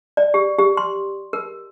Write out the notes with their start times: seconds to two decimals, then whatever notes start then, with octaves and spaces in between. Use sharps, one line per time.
0.17 D5
0.34 G4
0.59 G4
0.77 C6
1.33 A#4